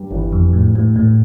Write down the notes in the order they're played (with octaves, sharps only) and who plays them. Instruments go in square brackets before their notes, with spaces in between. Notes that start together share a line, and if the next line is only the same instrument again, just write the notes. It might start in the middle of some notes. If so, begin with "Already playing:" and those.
Already playing: [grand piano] G2 G3
[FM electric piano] G1 [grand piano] E2 E3
[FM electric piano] F2
A2
A2
A2